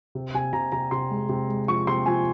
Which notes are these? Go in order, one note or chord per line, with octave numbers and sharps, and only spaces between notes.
C3
C3 G#5
C3 A#5
C3 A#5
C3 C6
G#3
C3
G#3
F3 C#6
C3 C6
F3 G#5